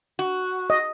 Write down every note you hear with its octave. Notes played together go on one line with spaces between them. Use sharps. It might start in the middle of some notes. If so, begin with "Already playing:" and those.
F#4
D#5